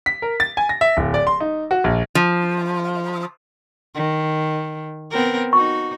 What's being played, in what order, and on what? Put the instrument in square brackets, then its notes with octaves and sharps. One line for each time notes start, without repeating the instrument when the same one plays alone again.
[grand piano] B6
A#4
A6
G#5
A#6
E5
D1
D5
C6
D#4
F#4
A#1
[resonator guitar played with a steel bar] F3
[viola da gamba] D#3
B3 C4 A#4
[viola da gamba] D#4 F#4 [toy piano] C#6